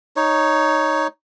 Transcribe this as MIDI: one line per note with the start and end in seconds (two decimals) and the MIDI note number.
0.16 1.07 63
0.16 1.07 73